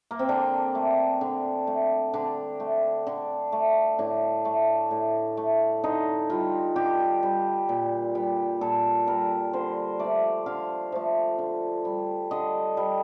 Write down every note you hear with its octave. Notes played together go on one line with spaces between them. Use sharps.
A#3
C4
D3 D4
A3
D3
A3
D3 D4
A3
D3
A3
A2 D4
A3
A2
A3
D3 D#4
G3 F4
D3 G4
G3
A#2
G3
A#2 A4
G3 A#4
D3 C5
F3 A3 D5
D3 F5
F3 A3
D3
G3
D3 D#5
G3